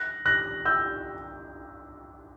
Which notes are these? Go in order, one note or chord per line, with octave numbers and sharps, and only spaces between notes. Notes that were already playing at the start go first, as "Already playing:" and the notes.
Already playing: F#6 A#6
F#6 A#6
E6 G6